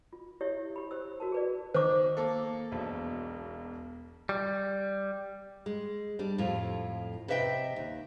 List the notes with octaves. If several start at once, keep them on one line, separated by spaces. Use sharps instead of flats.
F4
E4 G4 C#5 E5
G4 B5
C5 E6
F#4 A#4 A5
G#4 B4 D5
D#3 C5 D6
A#3 A4
E1 B1
G3
G#3
G3 D4
F2 A2 F4
C3 B4 D#5 E5 F#5 G5
D#2